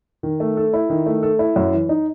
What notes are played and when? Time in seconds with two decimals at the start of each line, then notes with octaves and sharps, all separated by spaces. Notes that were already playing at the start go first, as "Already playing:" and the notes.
0.23 D#3
0.40 A3
0.57 A4
0.73 E4
0.90 D#3
1.06 A3
1.23 A4
1.39 E4
1.56 F#2
1.73 E3
1.89 D#4